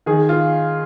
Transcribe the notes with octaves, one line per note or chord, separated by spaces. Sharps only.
D#3 G#4
F4